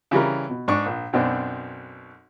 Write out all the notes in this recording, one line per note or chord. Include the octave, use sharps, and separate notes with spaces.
C#3 E3 G3 A#4
B2
G#2 D4 D5 C#6
A#1
B1 F#2 B2 C4 D4